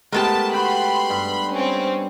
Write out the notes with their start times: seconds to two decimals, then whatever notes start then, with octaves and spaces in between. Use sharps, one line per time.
0.12 G#3 A3 B3 G4 A#4 A5
0.53 F#4 B4 G5 B5 C6
1.10 G2
1.52 C4 C#4